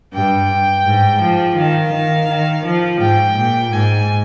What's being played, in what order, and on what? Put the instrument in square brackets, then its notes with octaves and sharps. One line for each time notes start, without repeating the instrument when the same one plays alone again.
[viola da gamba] G2 [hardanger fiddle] G5
[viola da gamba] G#2
F3
[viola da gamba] D#3 [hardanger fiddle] F5
[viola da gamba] D#3
D#3
F3
[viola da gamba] G#2 [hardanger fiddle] G5
[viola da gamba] A#2
[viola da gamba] G#2 [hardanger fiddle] G#5